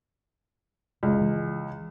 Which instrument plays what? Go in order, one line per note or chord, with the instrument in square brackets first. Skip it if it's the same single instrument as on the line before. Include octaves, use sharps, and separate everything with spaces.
[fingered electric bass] F#1 C#4 [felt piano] C#2
[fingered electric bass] E3